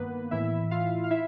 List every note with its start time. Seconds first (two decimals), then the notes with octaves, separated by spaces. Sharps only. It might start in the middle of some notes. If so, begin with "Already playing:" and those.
Already playing: G2 D#3 A#3 B3 B4
0.31 A2 E3 E4 E5
0.71 F4 F5
1.04 F5
1.10 E4 E5